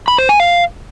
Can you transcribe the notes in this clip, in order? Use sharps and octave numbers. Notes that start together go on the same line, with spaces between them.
B5
C5
G#5
F5